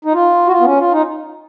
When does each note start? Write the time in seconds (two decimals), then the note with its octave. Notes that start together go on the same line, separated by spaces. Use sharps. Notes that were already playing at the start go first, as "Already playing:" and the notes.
0.05 D#4
0.14 F4
0.47 F#4
0.52 F4
0.60 B3
0.65 C#4
0.79 F4
0.92 D#4